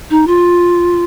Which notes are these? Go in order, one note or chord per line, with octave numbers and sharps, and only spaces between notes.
D#4
F4